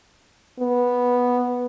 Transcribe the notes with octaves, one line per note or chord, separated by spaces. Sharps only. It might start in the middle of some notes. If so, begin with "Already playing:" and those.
B3